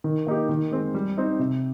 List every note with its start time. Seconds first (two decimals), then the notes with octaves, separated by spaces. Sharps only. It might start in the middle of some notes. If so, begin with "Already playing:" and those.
0.04 D#3
0.27 A#3 D#4 G4
0.49 D#3
0.71 G#3 C4
0.94 G3
1.17 C4 D#4
1.39 C3